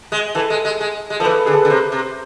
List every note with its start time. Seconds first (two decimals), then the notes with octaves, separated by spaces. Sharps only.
0.12 G#3
0.35 E3 A4
0.50 G#3
0.65 G#3
0.81 G#3
1.10 G#3
1.20 F3 A4
1.25 E3 B4
1.46 D3 G#4
1.54 A4
1.62 B4
1.65 D3
1.70 C3 C5
1.92 C3